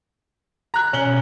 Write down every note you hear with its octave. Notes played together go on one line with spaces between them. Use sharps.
A#5 F#6
B2 C#4 F#7 G7